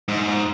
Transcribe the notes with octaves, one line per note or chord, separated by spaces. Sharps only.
G#2